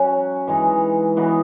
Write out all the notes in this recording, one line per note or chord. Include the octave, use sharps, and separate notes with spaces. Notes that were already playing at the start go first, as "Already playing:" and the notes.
Already playing: F#3 C#4 F#4
E3 G#3 D#4
E3 B3 D#4 F#4